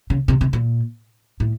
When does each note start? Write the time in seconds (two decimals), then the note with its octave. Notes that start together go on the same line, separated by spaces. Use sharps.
0.10 C#3
0.28 C3
0.41 C3
0.53 A#2
1.40 A2